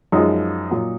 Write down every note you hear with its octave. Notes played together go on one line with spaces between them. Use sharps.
F#2 F3 G#3 D#4
A#2 F#3